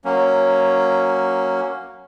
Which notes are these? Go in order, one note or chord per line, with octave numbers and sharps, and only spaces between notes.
F#3 A#3 C#4